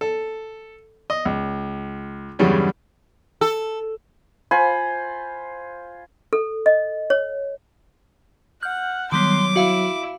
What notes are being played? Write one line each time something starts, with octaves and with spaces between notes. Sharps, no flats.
A4
D#5
C#2
E2 G2 C#3 F#3 G3 C#4
A4
F4 C5 G#5 B5
A4
D#5
C#5
F#5 F6 G6
D#3 F#3 G3 B3 C6 D6
E4 F#4 F5